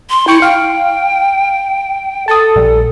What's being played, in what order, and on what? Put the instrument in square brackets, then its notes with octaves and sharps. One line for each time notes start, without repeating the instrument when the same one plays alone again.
[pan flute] C6
[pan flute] E4 [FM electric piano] G5 C#6 C#7
[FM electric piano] F5 [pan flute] G5
[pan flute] A4 [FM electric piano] A5 D#6
[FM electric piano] A#1 G3